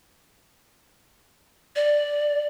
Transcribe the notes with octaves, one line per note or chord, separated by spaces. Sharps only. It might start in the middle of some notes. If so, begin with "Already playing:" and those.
D5